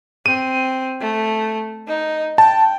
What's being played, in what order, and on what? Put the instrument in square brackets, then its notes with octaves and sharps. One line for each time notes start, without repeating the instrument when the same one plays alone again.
[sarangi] C4 [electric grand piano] D#7
[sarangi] A3
D#4
[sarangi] G5 [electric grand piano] A5